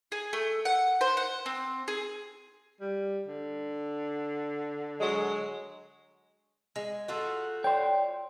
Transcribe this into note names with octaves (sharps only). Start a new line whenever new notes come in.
G#4
A3
F#5
C5
F#5
C4
G#4
G3
D3
F#3 G#3
G#3
A3 F4 F#4
C#5 D5 G5 C6